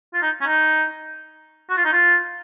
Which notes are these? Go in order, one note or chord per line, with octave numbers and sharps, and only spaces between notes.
F4
D#4
C#4
D#4
F#4
F4
D#4
F4